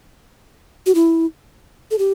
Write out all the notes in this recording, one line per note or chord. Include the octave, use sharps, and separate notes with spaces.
F#4
E4
A4
G4